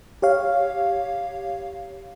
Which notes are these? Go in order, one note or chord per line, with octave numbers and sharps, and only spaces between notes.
G4 C#5 F5